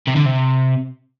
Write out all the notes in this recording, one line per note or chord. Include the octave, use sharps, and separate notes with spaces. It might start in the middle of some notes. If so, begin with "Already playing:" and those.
C3
D3
C3